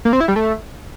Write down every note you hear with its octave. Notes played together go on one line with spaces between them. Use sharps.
A#3
C4
E4
G3
A3